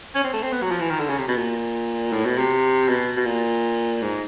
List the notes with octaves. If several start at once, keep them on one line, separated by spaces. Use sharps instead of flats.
C#4
C4
A3
C4
B3
F#3
F3
E3
D#3
D3
C#3
C3
B2
A#2
A2
B2
C3
B2
B2
A#2
G#2